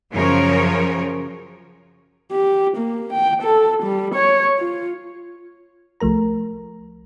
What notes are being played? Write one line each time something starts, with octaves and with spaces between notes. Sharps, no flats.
F#2 C#3 F3 A#4 C#5
G4
A#3
G5
A4
G3
C#5
F4
C2 F3 A3 A#4 A#5